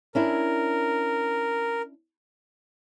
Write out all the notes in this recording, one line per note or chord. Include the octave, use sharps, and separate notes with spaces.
C#4 D4 E4 A#4